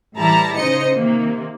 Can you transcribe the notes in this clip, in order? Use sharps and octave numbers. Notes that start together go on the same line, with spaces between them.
A2 E3 G3 E4 A5 A#5
C#3 D#4 C5 D#5 C#7
C3 D#3 A#3